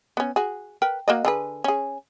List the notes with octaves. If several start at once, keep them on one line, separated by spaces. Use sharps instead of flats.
B3 C#4
F#4 G#4
A#4 B4 G5
A#3 F#4 D#5
D3 G#4 B4
C#4 G#4